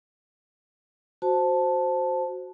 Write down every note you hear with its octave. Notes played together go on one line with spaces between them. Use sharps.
F#4 C5 A5